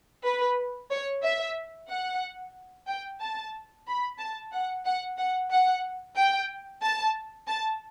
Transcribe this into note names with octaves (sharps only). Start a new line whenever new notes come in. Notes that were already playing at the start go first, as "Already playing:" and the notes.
B4
C#5
E5
F#5
G5
A5
B5
A5
F#5
F#5
F#5
F#5
G5
A5
A5